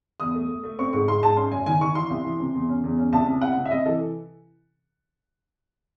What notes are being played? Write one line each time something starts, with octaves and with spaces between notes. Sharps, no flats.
E2 D#6
A3
A3
A3
C4 C#6
G#2 C#6
G#2 C6
G#2 A5
C#4 C6
F#2 G#5
D#3 G#5
D#3 C#6
E3 C6
C2
E3
C3
E2
C#4
E2
C#4
C2 A5
C3
C2 F#5
C3
E5
C3 D#5
E3 A4